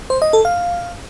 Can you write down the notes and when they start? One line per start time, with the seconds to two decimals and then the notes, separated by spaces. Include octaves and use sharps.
0.10 C5
0.22 D#5
0.33 A4
0.45 F5